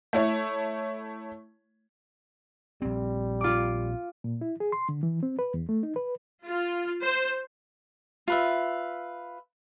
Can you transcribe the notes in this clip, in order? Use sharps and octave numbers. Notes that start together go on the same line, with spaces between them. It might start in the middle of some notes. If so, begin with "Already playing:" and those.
A3 E4 C#5
A#1 G3 C4
F4 D6
A#2
E4
G#4
C6
D3
E3
C4
B4
E2
A3
D#4
B4
F4
C5
F4 B4 E5